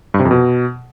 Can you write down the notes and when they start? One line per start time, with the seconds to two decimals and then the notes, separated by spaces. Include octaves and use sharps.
0.14 G2
0.20 C3
0.25 F2
0.31 B2